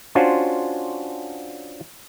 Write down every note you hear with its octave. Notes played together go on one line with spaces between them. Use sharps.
C#4 D4 F4 F#4 C5